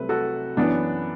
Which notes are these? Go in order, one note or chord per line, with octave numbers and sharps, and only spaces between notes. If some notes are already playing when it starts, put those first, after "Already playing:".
Already playing: C2 C3 F#3 A3 C4 B4
F#4 A4
F#2 E3 B3 D4